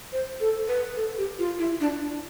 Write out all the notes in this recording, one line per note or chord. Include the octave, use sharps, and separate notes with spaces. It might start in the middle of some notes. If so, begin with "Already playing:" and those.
C5
A4
B4
A4
G4
F4
E4
D4